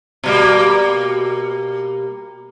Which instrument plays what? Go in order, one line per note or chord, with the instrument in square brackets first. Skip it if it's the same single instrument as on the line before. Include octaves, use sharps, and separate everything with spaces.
[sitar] B2 G3 A#3